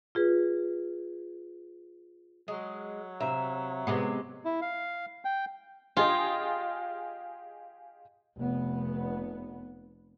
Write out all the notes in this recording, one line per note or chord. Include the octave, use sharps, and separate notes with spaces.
F4 G#4 B4
F#3 G#3
C3 E5 F5 A#5
C3 G#3 B3
E4
F5
G5
F4 G4 G#4 D#5
F1 B3